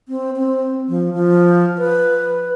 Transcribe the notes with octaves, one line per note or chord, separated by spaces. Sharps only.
C4
C4
F3
F3
B4